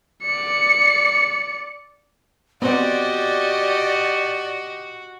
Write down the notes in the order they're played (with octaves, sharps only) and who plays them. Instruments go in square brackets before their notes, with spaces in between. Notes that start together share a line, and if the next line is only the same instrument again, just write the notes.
[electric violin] D5 C#7
[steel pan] B3 C4 C5 [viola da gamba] F#4 [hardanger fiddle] G4 D#5 [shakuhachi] D5